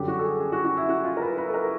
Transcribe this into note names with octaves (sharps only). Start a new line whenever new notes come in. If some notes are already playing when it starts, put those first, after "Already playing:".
Already playing: F#2 D3 G3 G4
F#4
A4
G#4
G#4
F#4
F#4
E4
F#4
F4
A#4
B4
B4
A4
A#4